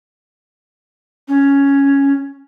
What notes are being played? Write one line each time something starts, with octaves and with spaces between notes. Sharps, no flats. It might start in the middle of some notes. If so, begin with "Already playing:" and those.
C#4